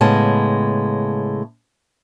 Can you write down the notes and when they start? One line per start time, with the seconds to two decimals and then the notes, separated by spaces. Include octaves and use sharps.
0.01 A2 C#3 G#3 B3 A5